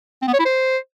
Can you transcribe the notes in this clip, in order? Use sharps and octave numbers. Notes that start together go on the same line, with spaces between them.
C4
B3
C#5
E4
C5